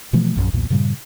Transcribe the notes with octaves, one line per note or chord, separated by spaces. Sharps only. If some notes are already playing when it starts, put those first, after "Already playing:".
B2 E3 F3 A3
A#1 F#2
B1 E2 A#2
G2 A#2 C#3 G3